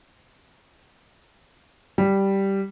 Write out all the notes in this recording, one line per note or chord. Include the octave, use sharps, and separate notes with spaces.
G3